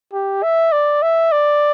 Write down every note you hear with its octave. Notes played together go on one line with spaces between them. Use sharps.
G4
E5
D5
E5
D5